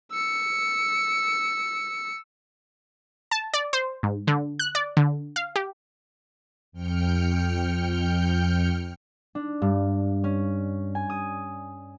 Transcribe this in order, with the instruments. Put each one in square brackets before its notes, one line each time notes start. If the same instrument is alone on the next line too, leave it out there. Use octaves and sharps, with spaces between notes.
[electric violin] E6 C#7
[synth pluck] A5
D5
C5
G#2
D3
F#6
D5
D3
F5
G4
[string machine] F2 G5 F6 G6 C#7
[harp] D4
G2
C#4
G#5
D#6